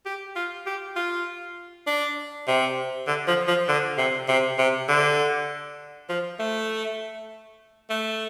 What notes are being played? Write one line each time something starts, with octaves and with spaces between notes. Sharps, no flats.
G4
F4
G4
F4
D4
C3
D3
F3
F3
D3
C3
C3
C3
D3
F3
A3
A3